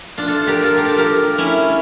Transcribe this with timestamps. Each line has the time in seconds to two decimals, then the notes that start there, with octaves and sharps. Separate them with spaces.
0.18 D4 F4
0.28 F4 A4
0.47 G4 A#4
0.63 F4 A4
0.77 G4 A#4
0.88 F4 A4
0.98 G4 A#4
1.38 C#4 E4